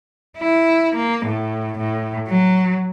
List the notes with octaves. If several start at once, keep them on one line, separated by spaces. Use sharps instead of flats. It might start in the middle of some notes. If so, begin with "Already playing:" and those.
E4
A#3
A2
A2
F#3